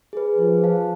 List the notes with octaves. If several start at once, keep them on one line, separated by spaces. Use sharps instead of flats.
G#4 B4
F3 G#4
C5 F5 A5